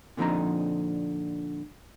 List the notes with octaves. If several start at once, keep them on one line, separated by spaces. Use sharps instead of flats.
A#2 D3 F3 C4 D#4 A#5